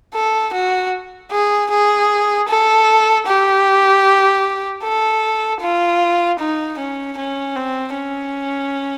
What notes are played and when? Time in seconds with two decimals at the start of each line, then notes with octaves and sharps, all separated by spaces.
0.14 A4
0.53 F#4
1.31 G#4
1.71 G#4
2.48 A4
3.26 G4
4.82 A4
5.61 F4
6.39 D#4
6.78 C#4
7.17 C#4
7.56 C4
7.95 C#4